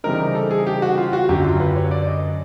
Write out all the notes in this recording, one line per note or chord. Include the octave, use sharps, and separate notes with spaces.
C#3 E3 G3 C4 D#4 A#4
A4
G#4
G4
F#4
F4
F#4
F#2 D3 F#3 G4
F4
B4
C#5
D5
D#5